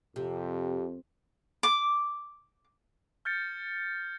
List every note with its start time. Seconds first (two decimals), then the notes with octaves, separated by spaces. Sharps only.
0.16 F2 C3 G4
1.63 D6
3.25 F6 G6 A6 C#7